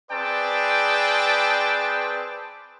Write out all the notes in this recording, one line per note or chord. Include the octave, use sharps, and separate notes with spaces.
C4 G#4 B4 D5 G5 A5